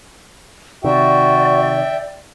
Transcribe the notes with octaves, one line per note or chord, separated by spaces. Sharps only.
C3 D#3 F#4 D5 E5 G5